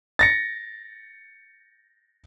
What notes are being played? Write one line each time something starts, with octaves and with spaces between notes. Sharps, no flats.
A6 A#6 C#7